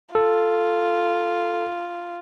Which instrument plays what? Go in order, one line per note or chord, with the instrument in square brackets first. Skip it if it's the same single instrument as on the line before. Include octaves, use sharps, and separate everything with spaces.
[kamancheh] F4 [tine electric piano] A4